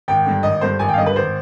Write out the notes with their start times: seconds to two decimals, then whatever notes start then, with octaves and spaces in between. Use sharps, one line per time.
0.08 G#1 G5
0.26 G2 D3
0.43 G#1 D#5
0.61 G2 D3 C5
0.79 G#1 G#5
0.89 G5
0.93 F5
0.97 G2 D3 D#5
1.06 B4
1.16 G#1 C5